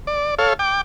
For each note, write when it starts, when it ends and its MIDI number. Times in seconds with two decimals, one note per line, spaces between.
0.07 0.35 74
0.38 0.54 69
0.38 0.54 73
0.38 0.54 77
0.59 0.81 79
0.59 0.81 86